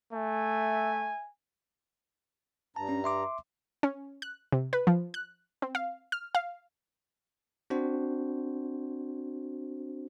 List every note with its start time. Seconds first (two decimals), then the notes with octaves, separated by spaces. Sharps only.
0.13 A3 E5 G#5
2.76 G2 A5 A#5
2.89 C#4
3.04 E5 C6 D6
3.83 C#4
4.22 F#6
4.52 C3
4.73 B4
4.87 F3
5.14 F#6
5.62 C4
5.75 F5
6.12 F6
6.35 F5
7.70 C4 D4 F#4 C5